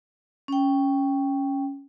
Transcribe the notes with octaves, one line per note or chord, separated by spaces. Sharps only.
C#4 G5